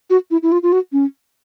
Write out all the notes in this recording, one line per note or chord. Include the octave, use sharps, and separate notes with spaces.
F#4
E4
E4
F4
F4
F#4
C#4